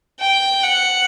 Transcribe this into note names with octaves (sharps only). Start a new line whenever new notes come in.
G5
F#5